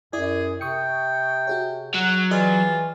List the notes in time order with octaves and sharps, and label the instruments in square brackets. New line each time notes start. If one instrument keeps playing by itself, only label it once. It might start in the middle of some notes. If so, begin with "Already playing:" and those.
[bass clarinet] F#2 [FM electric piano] E4 D5 [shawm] G#4
[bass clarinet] C3 [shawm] G5 [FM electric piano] C#6 D#6 C#7
[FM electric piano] F#4 G#4 C#5
[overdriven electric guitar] F#3 [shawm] F#5
[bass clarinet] E3 [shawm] F4 [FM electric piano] G#4 D5 D#5